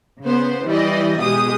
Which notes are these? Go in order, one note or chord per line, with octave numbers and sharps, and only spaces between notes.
C#3 B3 C5
E3 G3 E4 G4 D5 D#5
B2 G#3 G4 D#6